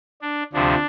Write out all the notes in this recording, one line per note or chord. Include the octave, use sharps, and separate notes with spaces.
D4
D2 C3 F3 D4